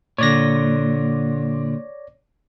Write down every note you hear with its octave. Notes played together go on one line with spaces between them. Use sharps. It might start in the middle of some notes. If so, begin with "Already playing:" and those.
A#2 D3 C#5 D5 A#6